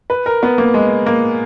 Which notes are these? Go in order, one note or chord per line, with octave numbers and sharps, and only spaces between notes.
B4
A#4
B3
A#3
G#3
A#3